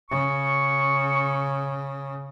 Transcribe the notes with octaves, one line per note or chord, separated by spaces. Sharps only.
C#3 C#6